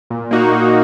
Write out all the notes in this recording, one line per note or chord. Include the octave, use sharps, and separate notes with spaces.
A#2
A#3 D#4 F#4
A#2